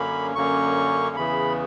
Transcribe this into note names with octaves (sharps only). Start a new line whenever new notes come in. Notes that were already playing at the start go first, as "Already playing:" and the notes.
Already playing: F#2 D3 A#3 C#4 B5
F#2 D3 A#3 C#4 C#6
E2 C#3 E3 B5